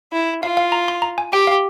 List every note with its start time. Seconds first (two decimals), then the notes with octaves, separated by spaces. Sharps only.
0.12 E4
0.43 F4 F5
0.57 F5
0.72 A#5
0.88 C6
1.02 A#5
1.18 G#5
1.32 G4 G5
1.47 F5